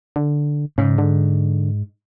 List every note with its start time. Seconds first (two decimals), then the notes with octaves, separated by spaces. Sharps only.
0.16 D3
0.78 G#2 C#3
0.98 D3